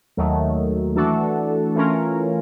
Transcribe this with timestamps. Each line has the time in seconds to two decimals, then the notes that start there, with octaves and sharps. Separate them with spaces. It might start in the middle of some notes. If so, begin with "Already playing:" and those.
0.17 D#2 D#3 F#3 A3
0.96 E3 A3 D4 F#4 A4
1.75 E3 A3 C#4 F4 A#4